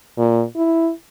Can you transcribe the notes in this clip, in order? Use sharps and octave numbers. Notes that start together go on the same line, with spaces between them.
A#2
E4